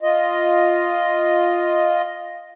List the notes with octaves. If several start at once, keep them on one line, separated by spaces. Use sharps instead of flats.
F4 D#5